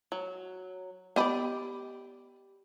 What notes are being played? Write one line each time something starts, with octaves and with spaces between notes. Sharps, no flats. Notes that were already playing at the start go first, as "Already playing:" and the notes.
F#3
B3 G4 D5 D#5 B5